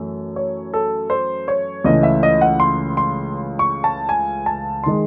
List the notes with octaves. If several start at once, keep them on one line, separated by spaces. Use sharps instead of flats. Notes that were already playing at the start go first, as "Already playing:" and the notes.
Already playing: F#2 E3 A3
C#5
A4
C5
C#5
C#2 C#3 E3 A3 D#5
E5
D#5
F#5
C6
C6
C#6
A5
G#5
A5
D#3 G#3 C6